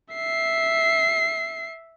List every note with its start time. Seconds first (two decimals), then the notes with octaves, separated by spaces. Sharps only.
0.14 E5 C7